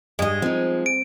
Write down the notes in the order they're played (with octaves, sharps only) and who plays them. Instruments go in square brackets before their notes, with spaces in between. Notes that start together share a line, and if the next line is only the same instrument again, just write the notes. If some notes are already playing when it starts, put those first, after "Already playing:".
[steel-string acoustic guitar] G2 D#5 [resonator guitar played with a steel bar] G#3
[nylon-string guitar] F3 D#4 [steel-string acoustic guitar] C4
[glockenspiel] D7